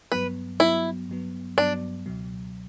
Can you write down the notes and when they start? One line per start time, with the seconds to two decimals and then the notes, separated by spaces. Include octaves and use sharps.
0.12 G2 F#3 B3 B4
0.60 G2 F#3 B3 E4
1.09 G2 F#3 B3
1.57 G2 F#3 B3 D4
2.06 C#2 B2 F#3